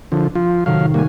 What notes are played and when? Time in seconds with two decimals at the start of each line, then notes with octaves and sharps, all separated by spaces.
0.12 D3 F3
0.35 F3 F4
0.66 A2 C3 D#3 F#3 F5
0.94 G3 A#3 F#4 G#5